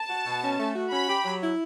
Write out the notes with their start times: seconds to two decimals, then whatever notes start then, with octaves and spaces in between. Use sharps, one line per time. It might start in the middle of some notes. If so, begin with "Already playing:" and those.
Already playing: A5
0.09 F#4
0.26 B2
0.42 C#4
0.59 A3
0.75 F#4
0.91 C#4 B5
1.09 G4
1.25 F#3
1.42 E4